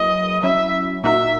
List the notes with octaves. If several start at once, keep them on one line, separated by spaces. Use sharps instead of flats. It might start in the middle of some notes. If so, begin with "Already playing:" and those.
Already playing: F#3 A#3 E4 G#4 B4 D#5
F#3 C#4 E4 E5
A#2 A#3 D#4 F#4 A#4 E5